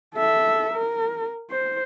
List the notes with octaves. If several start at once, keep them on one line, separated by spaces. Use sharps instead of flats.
A4 E5
A#4
C5